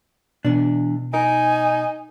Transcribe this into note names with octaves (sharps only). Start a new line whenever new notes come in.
E2 B2 D4
D#4 A#4 G#5